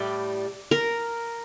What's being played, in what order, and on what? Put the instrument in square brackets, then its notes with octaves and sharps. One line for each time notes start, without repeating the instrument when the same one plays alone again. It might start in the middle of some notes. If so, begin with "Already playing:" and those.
Already playing: [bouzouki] A2 G3 [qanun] D5
[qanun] A#4